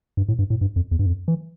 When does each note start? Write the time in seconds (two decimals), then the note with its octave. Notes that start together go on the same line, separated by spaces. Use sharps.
0.17 G2
0.29 A2
0.39 G2
0.50 A2
0.61 G2
0.76 F2
0.91 E2
0.99 G2
1.06 F2
1.28 E3